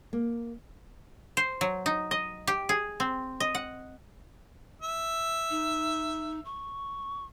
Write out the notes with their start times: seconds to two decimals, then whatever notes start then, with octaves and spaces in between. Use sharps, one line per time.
0.13 A#3
1.37 C5
1.61 F#3
1.86 D#4
2.11 D#5
2.47 G4
2.69 G#4
3.00 C4
3.40 D#5
3.55 F#5
4.82 E5
5.50 D#4
6.45 C#6